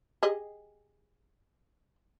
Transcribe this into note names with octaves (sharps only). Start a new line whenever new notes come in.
G4 G#4 D#5